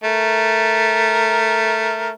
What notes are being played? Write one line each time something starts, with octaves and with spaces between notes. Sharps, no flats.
A3 A#4